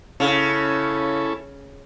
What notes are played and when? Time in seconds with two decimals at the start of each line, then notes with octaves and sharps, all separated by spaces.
0.20 C#3 C#4 E4 A4